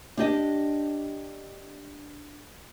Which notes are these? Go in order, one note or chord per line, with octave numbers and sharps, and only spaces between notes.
D4 G4 D#5